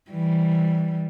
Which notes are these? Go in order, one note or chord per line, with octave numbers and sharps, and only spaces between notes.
E3 G3